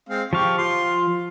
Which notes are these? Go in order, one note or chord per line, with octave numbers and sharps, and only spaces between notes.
G#3 C4 F5
F3 G4 F5 C#6
F4 C6